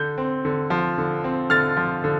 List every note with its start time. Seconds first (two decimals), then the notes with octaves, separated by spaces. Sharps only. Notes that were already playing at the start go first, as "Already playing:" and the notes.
Already playing: D3 G6
0.18 C4
0.45 D3
0.70 F3
0.98 D3
1.24 C4
1.50 D3 F6 A6
1.77 F3
2.04 D3